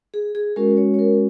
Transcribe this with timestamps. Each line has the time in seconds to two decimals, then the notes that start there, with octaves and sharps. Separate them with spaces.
0.14 G#4
0.35 G#4
0.56 G#3 C#4 F#4 A#4
0.77 C#5
0.94 C#5
0.99 A#4